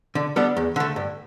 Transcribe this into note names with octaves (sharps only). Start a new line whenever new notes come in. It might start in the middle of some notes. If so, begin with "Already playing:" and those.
D3
G3 B3 D4 A4
E2
D3 A3
G2